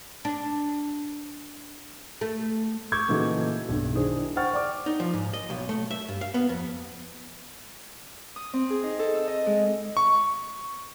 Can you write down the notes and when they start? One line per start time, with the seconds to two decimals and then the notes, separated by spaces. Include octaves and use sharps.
0.25 D4
2.21 A3
2.92 C#6 D6 E6 G6 G#6
3.09 A#2 C#3 E3 D#4 F#4 A4
3.69 B1 G2
3.95 D#3 D4 E4 G#4 C5
4.36 C5 F#5 G5 C#6 F6 A6
4.53 D5 D6
4.86 D#4
5.00 F3
5.14 G#2
5.34 D#5
5.50 B1
5.69 A3
5.91 E5
6.08 G2
6.21 F5
6.34 B3
6.49 F2
8.36 D#6
8.54 C4
8.70 G#4
8.83 D#4
8.99 A4
9.15 E6
9.28 D#5
9.46 G#3
9.97 C#6